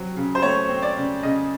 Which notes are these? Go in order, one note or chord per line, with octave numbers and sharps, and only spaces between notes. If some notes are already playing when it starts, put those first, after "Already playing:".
Already playing: F#3 C4
C#3
C5
A3 C#5
C4
D5
C#3
C#3 D#5